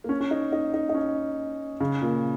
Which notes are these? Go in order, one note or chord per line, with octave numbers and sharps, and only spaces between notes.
A#3
C#4
C#4
D#4
D#4
D#4
D#4
C#4
C#3
A#2